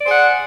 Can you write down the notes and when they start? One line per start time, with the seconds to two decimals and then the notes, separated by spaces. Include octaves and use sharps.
0.01 D5
0.04 C5
0.07 G#4
0.09 F#5